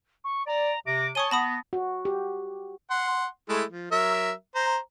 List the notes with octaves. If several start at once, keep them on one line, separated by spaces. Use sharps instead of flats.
C#6
D5 A#5
C3 D6 A#6
C#5 G#5 A5 C#6 D#6 D#7 G7
B3 A5 B5 D#6 A#6
F#4
G4
F#5 C6
G#3 A3 E4
F3
F#3 A#4 E5
C5 A#5